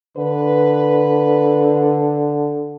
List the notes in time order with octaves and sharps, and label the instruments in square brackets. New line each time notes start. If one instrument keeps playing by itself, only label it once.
[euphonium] D3 [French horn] B4